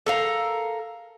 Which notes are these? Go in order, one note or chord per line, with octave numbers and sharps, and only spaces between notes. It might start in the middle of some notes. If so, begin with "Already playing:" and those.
A4 A#4 F5